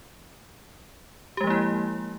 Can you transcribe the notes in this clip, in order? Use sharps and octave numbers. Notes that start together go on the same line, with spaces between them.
F3 G#3 A#3 E4 G4